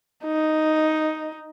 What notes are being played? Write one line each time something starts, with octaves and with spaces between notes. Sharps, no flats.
D#4